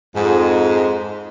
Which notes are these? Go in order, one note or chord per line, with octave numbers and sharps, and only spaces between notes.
F2 G#2